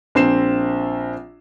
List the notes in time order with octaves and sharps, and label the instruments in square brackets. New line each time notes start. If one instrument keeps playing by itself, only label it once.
[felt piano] A#1 C4 C7 E7